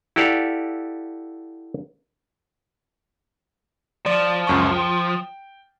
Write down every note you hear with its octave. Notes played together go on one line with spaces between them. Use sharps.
E4 F#4 G4 A4 D5 F5
F3 D5
C#2 F#2 C#6
G5